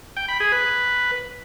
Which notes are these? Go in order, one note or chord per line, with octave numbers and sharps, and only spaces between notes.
G5
B5
G#4
B4